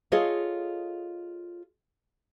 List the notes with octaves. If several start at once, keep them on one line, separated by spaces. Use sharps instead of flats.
F4 G#4 A4 C#5 D#5 F5